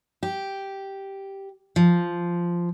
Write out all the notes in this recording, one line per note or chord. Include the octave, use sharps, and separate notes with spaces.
G4
F3